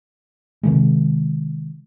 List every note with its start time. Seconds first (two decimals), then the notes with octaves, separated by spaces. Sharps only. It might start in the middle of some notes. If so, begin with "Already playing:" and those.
0.63 C3 D#3 G#3